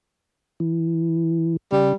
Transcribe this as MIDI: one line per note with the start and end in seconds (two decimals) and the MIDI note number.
0.60 1.57 52
1.72 1.93 49
1.72 1.93 55